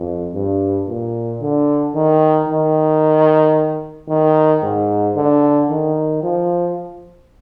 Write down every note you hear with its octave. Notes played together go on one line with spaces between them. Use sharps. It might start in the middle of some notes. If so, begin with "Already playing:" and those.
Already playing: F2
G2
A#2
D3
D#3
D#3
D#3
G#2
D3
D#3
F3